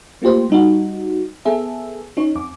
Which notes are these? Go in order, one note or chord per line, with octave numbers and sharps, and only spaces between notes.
A3 A#3 F4 G4 C5
G3 D#4 F#4
B3 G#4 A4 E5
C#4 D#4 C#5
F2 D6